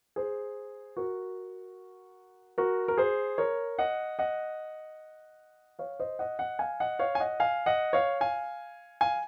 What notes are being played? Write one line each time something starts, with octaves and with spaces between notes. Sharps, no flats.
G#4 C5
F#4 A#4
F#4 A#4
A#4
G#4 C5
A#4 C#5
D#5 F#5
D#5 F#5
C#5 F5
C5 D#5
D#5 F#5
D#5 F#5
F5 G#5
D#5 F#5
C#5 F5
G#5
D#5 F#5
F5 G#5
D#5 F#5
C#5 F5
F5 G#5
F5 G#5